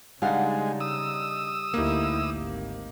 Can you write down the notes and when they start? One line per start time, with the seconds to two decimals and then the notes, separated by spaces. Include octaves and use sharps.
0.22 C#3 G3 G#3 D4 D#4 F5 F#5
0.80 D#6 E6
1.74 D2 A#3 D#4 E4 G4
2.30 G#1